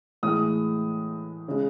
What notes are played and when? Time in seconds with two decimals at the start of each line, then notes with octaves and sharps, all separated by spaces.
0.23 A2 E3 G#3 D#6
1.48 C#3 G#3